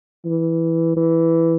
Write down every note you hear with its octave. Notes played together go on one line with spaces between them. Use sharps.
E3
E3